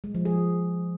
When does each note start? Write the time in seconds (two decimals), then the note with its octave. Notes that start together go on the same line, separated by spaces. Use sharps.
0.04 G#3
0.15 F3
0.25 G#4